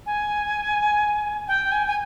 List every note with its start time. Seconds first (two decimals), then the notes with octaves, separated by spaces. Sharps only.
0.06 G#5
1.47 G5
1.71 G#5
1.87 G#5